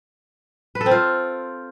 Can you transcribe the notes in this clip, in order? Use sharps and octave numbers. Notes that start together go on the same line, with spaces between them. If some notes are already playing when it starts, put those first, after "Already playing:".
B4
A4
C4
F4